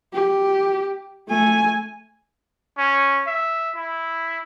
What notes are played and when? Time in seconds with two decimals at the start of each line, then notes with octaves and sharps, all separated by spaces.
0.13 G4
1.29 A3 G#5
2.78 C#4
3.27 E5
3.75 E4